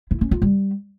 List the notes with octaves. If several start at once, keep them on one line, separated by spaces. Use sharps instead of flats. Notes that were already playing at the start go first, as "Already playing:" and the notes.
E4
C#4
F4
G3